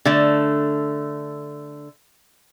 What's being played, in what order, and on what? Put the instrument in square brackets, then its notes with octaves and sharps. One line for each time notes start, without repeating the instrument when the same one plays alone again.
[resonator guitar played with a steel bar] D3 A3